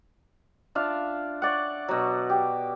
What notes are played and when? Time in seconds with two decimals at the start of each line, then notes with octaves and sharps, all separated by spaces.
0.75 D4 F4 E5 F5
1.42 C#5 D5 F#5
1.88 B2 F#3
2.30 G4